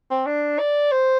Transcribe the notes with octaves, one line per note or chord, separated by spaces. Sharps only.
C4
D4
D5
C5